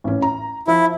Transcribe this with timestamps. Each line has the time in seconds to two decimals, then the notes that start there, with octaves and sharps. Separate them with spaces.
0.04 A1 C#4
0.22 A#5
0.67 F3 E4 E5